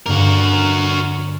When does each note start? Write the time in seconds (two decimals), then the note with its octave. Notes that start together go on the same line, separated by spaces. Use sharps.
0.06 G2 D3 A#3 F#4 A#4